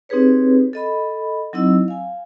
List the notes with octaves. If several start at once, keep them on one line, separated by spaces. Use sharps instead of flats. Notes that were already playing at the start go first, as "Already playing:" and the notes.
C4 D#4 G4 G#4 B4 C#5
A4 D#5 B5
F#3 C4 D#4 E4 D#5 E6
F5 G#5